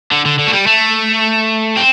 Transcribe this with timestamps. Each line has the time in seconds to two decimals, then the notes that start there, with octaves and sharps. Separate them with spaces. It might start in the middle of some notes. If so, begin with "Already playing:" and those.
0.12 D3
0.26 D3
0.39 D3
0.48 A3
0.53 G3
0.66 A3
1.77 C4